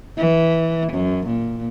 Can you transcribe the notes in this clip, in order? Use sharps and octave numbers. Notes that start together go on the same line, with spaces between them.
E3
F#2
A#2